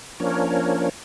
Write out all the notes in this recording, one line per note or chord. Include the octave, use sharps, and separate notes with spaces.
F3 A#3 C#4 D4 A#4 C#5